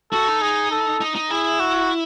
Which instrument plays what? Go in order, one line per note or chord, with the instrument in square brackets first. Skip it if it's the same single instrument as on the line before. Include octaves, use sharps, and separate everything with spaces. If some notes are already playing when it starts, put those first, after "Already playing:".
[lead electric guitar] F#4 [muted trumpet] A4
[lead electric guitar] D#4
[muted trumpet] G#4
A4
[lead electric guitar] D#4
D#4
[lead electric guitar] E4 [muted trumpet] G#4
[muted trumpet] F#4